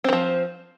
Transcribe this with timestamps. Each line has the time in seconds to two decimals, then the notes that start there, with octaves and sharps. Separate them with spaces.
0.04 C4
0.08 D#3
0.13 F3